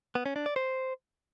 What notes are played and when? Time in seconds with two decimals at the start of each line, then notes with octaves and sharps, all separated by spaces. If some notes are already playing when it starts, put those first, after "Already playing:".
0.15 B3
0.26 C#4
0.36 D4
0.46 D5
0.56 C5